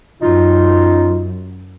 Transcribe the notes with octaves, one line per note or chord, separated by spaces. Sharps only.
F#2 D#4 F4